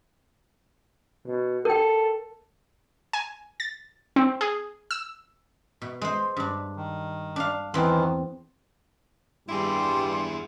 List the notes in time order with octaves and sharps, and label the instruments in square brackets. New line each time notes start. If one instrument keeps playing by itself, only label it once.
[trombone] B2
[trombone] A4 [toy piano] A#4 G5
[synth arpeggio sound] G#5
A6
C4
G#4
E6
[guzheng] B2
G#3 C5
G2 D4
[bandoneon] D#3
[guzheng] D4 F5
[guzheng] E2 C4 [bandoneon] D#3 E3 B3
[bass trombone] G2 [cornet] G3 [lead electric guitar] E4 G#4 [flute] C6